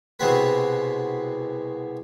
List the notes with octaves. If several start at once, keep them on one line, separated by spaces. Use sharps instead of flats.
C2 B2 G#3 C4 F#4 B4